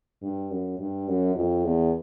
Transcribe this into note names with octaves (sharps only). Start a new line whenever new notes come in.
G2
F#2
G2
F#2
F2
E2